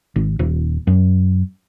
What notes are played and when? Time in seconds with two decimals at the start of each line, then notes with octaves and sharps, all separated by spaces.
0.16 G#1
0.39 D#1
0.87 F#2